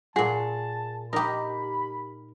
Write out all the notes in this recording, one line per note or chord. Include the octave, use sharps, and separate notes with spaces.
A#2 F#4 G#4 A5
D#4 G4 A#4 B5